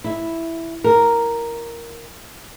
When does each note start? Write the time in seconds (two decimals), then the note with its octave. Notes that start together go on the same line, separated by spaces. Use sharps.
0.04 E4
0.84 A#4